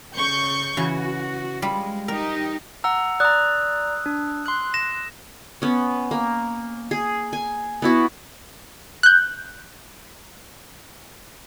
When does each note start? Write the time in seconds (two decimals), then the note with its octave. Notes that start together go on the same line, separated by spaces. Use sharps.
0.15 C#3 C#6 G6
0.77 C#3 E3 F#4
1.62 G3 G#3 F4 B5
2.08 D#4 G4 A#4
2.84 F#5 A#5 E6
3.20 D5 A#5 D#6 F#6
4.06 D4
4.46 C6 F#6
4.74 A#6 E7
5.62 B3 C#4
6.11 A#3
6.91 G#4
7.33 G#5
7.82 B3 E4 F#4
9.03 F#6 G6